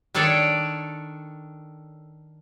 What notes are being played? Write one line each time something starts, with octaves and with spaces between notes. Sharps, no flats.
D#3 D4 A4 C#5 D5